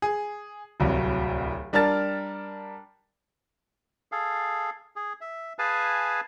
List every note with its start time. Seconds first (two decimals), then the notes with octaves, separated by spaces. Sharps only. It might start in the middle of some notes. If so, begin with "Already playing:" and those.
0.02 G#4
0.80 D1 C2 F#3
1.73 G3 D4 A#4 A5 F6 A6
4.12 G#4 A4 F5
4.96 G#4
5.21 E5
5.59 G#4 B4 F5 G#5 A5